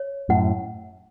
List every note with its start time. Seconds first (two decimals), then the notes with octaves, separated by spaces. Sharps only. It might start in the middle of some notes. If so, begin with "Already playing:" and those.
Already playing: C#5
0.29 F#2 A2 F#5